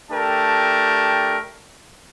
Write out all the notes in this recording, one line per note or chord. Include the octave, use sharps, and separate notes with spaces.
A3 D4 G4 A#4 G5 A5